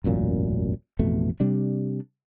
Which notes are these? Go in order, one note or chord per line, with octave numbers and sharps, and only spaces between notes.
E1 A1 F#2 A#2
A1 F2 B2 A3
C3 G3 D4